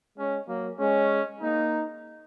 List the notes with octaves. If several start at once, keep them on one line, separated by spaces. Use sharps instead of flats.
G#3 C#4
F#3 A#3
G#3 C#4
A#3 D#4